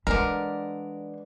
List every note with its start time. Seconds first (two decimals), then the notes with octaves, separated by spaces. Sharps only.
0.07 D3 E3 G#3 D4 A#4 B4 D5